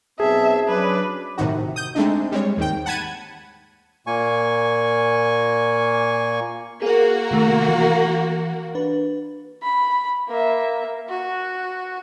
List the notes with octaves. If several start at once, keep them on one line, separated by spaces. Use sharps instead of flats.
B1 C4 G#4 E5 A5
F#3 C#4 D4 B4
A2 C3 D#3 D#4 F#4
D#6 G6
G#3 A3 C4 D4 D#4
G3 G#3 C4 C#5
D#2 G#2 D#3 G5
F#5 A5 B5 G#6 D#7
A#2 A#3 G#5 C#6
A#3 F#4 G#4 A#4
C3 D#3 A3
E3
D4 B4
B5
A#3 E5
F#4